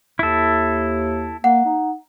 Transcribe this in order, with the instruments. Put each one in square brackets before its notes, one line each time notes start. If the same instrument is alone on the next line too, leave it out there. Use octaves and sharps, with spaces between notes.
[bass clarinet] D#2 [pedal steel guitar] E4 A4
[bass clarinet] A#3 [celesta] F#5
[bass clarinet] D#4